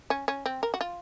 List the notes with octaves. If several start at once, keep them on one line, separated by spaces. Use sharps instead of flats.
C#4
C#4
C4
A#4
F#4
F4